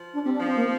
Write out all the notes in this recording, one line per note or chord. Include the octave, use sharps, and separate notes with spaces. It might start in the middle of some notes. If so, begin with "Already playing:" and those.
Already playing: F3
D4
G3 C4
D4
F3 C4
A#3